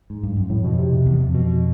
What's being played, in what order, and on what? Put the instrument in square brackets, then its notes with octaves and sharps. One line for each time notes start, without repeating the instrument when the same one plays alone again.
[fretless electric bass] G#2
G2
F#2
[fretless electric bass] F2 [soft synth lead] A2
[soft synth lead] B2
C3
[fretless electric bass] E2
F2
[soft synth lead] B2